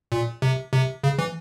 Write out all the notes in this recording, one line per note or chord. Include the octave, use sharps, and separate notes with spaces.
A#2
C3
C3
C#3
E3